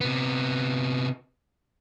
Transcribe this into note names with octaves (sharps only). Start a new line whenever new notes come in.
C3 B3